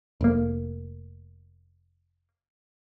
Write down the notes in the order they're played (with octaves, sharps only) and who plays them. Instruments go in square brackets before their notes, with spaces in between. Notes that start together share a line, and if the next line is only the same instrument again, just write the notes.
[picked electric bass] F1 A#3